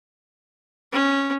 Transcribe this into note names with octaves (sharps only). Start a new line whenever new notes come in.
C#4